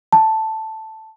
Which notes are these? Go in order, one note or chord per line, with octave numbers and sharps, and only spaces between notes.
A5